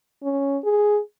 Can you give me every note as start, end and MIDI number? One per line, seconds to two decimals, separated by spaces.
0.23 0.57 61
0.64 1.00 68